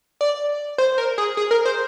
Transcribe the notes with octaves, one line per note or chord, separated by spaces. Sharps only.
D5
C5
A#4
G#4
G#4
A#4
C5